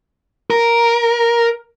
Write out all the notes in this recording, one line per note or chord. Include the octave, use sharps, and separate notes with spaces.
A#4